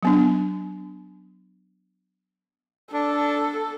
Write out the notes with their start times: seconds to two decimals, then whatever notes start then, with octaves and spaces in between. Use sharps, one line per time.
0.03 F#3 B3 D4
2.94 D4 A4